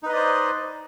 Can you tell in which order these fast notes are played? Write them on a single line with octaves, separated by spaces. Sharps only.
D#4 B4 D#5 D5 C5